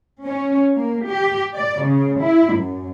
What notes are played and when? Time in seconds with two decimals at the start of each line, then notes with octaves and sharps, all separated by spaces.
0.23 C#4
0.76 A#3
1.07 G4
1.54 D5
1.84 C#3
2.20 E4
2.56 F#2